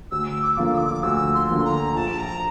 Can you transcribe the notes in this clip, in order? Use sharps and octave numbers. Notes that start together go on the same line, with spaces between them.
D2 E6
D6
D3 F3 A#3 F4
E6
D6
D2 E6
C6
D3 F3 A#3 F4
A#5
A#1 A5
A#5